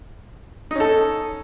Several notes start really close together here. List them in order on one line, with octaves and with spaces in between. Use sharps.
D#4 C#4 A4